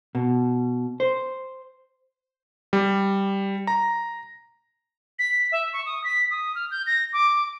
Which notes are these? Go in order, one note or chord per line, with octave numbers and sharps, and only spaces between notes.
B2
C5
G3
A#5
B6
E5
C#6
D#6
B6
D#6
F6
G6
A#6
D6